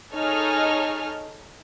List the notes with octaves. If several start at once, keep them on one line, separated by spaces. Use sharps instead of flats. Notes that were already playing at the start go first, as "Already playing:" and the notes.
D#4 G#4 A4 C#5 D#5 F6